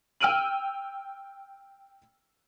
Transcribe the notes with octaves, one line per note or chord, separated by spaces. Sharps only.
G5 E6 F6 D7 D#7 F#7